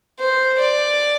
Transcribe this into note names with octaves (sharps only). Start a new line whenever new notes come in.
C5
D5